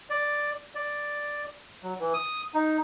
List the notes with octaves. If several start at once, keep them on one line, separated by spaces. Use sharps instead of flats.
D5
D5
F#3
E3
D#6
D#4